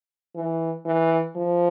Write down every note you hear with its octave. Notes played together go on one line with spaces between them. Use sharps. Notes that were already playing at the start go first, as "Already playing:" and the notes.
E3
E3
F3